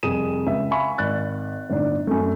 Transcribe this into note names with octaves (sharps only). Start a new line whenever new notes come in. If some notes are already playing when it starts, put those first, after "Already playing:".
C2 F2 G#4 D#6 D#7 E7
C#2 E5
E5 F5 G#5 B5 C#6
G#1 D5 F#6 A6
G1 A2 D4 D#4
F#2 A3